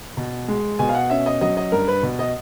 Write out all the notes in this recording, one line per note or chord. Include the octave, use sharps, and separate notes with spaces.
B2
G#3
B2 G#5
F5
F#5
C#4 E5
D#5
F#3 D#5
D#5
G2 A#4
B4
B2
D#5